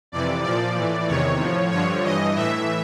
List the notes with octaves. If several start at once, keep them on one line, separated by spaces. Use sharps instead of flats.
F2 C3 E3 D5
A#2 F3 D5
A2 E3
E2 C3 D#3 C#5
A2 F3
G2 D3 F3 C#5
G2 E3 D#5
A2 E3 E5